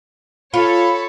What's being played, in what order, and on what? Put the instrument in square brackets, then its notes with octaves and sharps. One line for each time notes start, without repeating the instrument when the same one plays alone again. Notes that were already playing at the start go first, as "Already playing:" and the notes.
[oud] F4 [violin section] A4 C#5 [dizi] B5